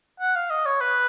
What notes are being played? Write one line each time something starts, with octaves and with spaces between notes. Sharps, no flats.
F#5
F5
D#5
C#5
B4